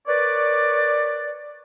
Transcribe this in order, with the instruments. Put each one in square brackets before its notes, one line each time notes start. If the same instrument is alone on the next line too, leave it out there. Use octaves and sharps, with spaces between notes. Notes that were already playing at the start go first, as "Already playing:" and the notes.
[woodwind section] A#4 B4 C#5 D5